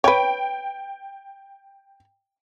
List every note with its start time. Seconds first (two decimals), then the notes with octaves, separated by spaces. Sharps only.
0.04 B4 C#5 G5